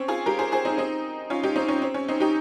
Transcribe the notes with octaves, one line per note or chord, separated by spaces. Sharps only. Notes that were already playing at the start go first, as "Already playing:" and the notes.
Already playing: C4 C#4
F4 G#4
G4 A#4
G#4 C5
G#4 C5
C4 D#4
C4 D#4
C#4 F4
D#4 G4
C4 D#4
C#4
C4
C#4
C4 D#4
D#4 G4